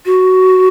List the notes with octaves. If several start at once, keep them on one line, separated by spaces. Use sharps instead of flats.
F#4